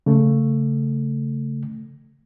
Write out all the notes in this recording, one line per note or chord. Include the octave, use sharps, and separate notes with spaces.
C#3 A3